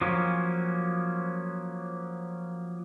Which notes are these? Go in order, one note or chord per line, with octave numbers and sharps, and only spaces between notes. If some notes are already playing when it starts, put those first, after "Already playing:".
F3 F#3 A#3 C#4